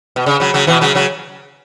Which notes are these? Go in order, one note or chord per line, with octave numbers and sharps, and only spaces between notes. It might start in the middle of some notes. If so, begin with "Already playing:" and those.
B2
C#3
C#3 F#3
C#3 F#3
B2 E3
C#3 F#3
C#3 F#3